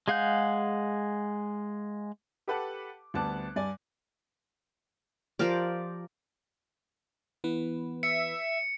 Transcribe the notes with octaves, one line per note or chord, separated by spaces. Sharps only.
G#3 G#4 F5 F#5 G6
G4 A4 B4 F#5 A5 D6
D2 G3 B3 A5 D6 F#6
G2 G3 D5 G#5
F3 G4 A#4 D5
E3 B3 B4
E5 C#7